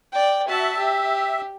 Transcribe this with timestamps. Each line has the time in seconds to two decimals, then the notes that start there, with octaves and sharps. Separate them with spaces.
0.12 D5 G5
0.48 F#4 E5 A5
0.78 G4